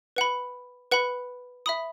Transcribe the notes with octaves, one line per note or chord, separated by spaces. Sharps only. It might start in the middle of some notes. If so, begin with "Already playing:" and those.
B4 F#5 B5
B4 F#5 B5
E5 B5 D#6